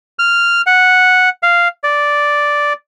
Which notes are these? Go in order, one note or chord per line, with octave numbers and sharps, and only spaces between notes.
F6
F#5
F5
D5